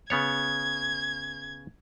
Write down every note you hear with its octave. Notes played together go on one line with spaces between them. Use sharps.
C#3 B3 C#5 G#6